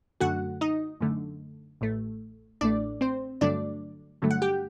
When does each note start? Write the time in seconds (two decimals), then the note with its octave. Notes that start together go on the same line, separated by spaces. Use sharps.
0.21 F#2 D3 A3 F#4 F#5
0.61 D#4 D#5
1.01 F#2 D3 A3
1.81 A1 A2 A3
2.61 A1 A2 A3 D4 D5
3.01 C4 C5
3.41 G2 D3 F#3 A3 D4 D5
4.22 G2 D3 F#3 A3
4.31 F#5
4.42 G4 G5